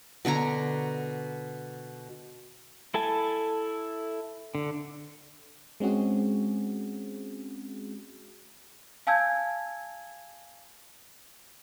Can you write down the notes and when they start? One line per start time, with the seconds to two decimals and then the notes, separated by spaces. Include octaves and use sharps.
0.25 B2 D3 C#5 A#5
2.94 E4 A4 G#5 A5
4.55 D3
5.80 G#3 C4 C#4 F#4 G#4
9.07 F5 G#5 A5 E6 G6 G#6